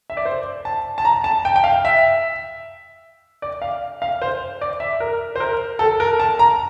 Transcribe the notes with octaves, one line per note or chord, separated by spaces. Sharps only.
E5
D5
C5
A5
A5
A#5
A5
G5
G5
F5
E5
D5
F5
F5
C5
D5
E5
A#4
C5
A#4
A4
A#4
A5
A#5